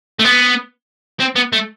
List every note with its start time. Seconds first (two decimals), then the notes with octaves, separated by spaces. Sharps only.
0.19 A3
0.25 B3
1.20 C4
1.36 B3
1.53 A3